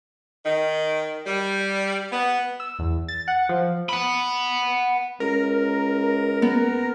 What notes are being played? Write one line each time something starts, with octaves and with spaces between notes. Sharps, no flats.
D#3
G3
B3
E6
E2
A6
F#5
F3
F#5 B5
C#2 A#4
B3